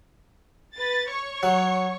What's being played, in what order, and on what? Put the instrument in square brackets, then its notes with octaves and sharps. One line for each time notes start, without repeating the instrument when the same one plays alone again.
[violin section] B4 A6
C#5 C#6
[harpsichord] F#3